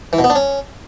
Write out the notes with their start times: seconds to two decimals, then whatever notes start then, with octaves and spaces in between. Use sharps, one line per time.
0.13 E3
0.19 B2
0.24 B3
0.30 D4
0.36 C#4